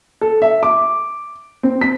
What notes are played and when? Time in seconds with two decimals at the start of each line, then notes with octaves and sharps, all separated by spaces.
0.21 A4
0.42 E5
0.63 D6
1.63 C4
1.81 B6